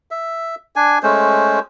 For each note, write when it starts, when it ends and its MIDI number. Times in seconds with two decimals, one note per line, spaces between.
0.11 0.55 76
0.76 0.99 62
0.76 0.99 80
1.03 1.60 56
1.03 1.60 57
1.03 1.60 61
1.03 1.60 72